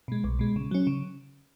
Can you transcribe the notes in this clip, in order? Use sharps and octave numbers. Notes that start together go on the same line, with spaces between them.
B2 G#3
B1
B2 G#3
C#3
F#3 C#4
C#3